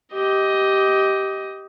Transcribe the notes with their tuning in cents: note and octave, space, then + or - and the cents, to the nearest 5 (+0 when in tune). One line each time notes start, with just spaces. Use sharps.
G4 -10 D#5 +15